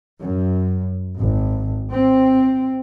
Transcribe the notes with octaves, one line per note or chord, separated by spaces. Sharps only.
F#2
G#1
C4